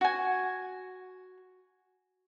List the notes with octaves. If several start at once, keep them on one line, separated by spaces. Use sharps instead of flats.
F#4 G#5